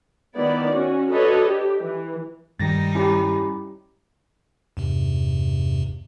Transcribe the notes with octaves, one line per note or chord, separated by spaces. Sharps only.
D#3 B3 E4 D5
C#4 F#4
D4 F#4 A4 B4 C#5 D#5
G4
E3
G2 D#3 G3 D#4 A6 A#6
C#4 E4 G4
E2 G2 C3